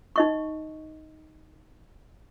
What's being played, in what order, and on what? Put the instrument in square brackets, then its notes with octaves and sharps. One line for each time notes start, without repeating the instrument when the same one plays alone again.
[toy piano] D#4 D#5 C#6